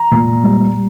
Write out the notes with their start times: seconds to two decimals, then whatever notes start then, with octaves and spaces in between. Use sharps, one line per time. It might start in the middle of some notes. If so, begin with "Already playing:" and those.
Already playing: A#5
0.11 A#2
0.43 G3